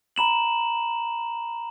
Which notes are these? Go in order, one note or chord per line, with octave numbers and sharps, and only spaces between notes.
A#5 B5 E7 F#7